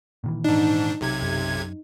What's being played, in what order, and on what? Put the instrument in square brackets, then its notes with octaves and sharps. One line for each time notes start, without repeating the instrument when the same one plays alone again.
[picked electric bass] A#2 D#3 E3
[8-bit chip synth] G#2 D4 [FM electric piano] D#4
[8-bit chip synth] B1 C3 G#6
[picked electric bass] F#2